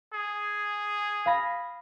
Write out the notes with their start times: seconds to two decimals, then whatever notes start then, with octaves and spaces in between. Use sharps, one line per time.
0.14 G#4
1.26 F5 B5 A#6